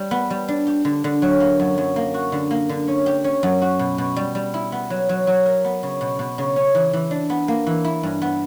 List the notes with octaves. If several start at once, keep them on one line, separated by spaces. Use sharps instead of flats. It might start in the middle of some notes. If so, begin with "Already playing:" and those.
Already playing: G3
B3
G3
D4
G4
D3
D3
F#3
A#3
F#2
F#2
A#3
F#4
D3
A#3
D3
C#4
G4
C#4
F#2
F#4
B2
B2
G3
G3
E4
B3
F#3
F#3
F#3
A#4
B3
C#3
B2
B2
C#3
C#4
E3
E3
D4
B3
A#3
E3
E4
G2
B3